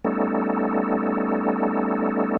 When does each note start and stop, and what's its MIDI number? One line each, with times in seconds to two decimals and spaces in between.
0.04 2.37 55
0.04 2.37 57
0.04 2.37 59
0.04 2.37 61
0.04 2.37 63
0.04 2.37 69